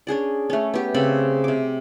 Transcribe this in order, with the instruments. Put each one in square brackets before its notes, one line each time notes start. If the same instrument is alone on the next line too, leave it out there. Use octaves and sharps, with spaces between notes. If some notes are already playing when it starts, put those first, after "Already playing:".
[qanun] C#4 D4 G#4 D5
A3 C#4
B3 G4
C#3 C4 A4 B5
C3 D6